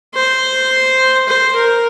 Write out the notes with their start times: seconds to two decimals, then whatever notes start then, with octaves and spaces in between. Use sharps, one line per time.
0.15 C5
1.29 C5
1.57 A#4